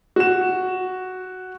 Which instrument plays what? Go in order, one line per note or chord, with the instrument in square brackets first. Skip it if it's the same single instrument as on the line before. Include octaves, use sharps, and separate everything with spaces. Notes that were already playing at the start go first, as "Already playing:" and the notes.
[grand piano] F#4 E7